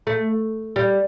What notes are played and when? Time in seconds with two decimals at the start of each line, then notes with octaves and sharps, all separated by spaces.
0.07 A3
0.76 G3